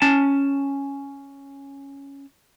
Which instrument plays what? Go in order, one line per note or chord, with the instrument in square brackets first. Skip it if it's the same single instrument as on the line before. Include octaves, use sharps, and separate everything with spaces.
[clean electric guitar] C#4 A5